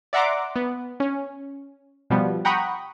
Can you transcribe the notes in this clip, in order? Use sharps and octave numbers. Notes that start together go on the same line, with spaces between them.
D5 E5 F#5 A#5 C6 D6
B3
C#4
B2 F3 G3 B3
F#5 G5 A#5 B5 C#6 D#6